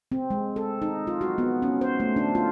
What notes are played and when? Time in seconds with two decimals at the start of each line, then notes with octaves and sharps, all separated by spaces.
0.12 C4
0.30 G#3
0.56 A4
0.82 D#4
1.07 F4
1.21 F#4
1.38 B3
1.62 C#4
1.81 C5
2.00 A3
2.16 D4
2.35 F4